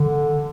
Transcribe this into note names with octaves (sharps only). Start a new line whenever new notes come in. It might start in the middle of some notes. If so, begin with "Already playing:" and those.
Already playing: D3